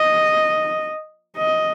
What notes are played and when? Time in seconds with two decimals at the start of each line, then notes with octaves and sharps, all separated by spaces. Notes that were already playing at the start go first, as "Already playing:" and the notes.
Already playing: D#5
1.37 D#5